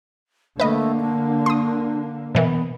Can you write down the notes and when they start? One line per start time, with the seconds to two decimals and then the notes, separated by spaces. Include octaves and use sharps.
0.60 D3 A3 A#3 B4 D#5
1.01 D4
1.46 C6 D#6
2.35 B2 E3 B3 A#4